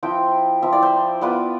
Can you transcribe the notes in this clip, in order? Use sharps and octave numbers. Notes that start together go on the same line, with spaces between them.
F3 C4 E4 E5 G5
F3 C4 E4 E5
D5
C5 E5
B3 F4 B4 D5